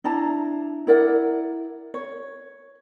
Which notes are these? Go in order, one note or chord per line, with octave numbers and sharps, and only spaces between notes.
D4 E4 A5 A#5
E4 A#4 D5 F#5
C#5